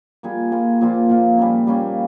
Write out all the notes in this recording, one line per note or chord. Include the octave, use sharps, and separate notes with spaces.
G3 A#3 F4 G#4
G3 A#3 F4 G#4
A#2 F3 A#3 F4
A#2 F3 A#3 F4
G3 A#3 C#4
G3 A#3 C#4